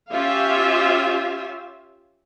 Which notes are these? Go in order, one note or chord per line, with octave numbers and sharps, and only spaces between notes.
C#4 F4 G4 E5 F5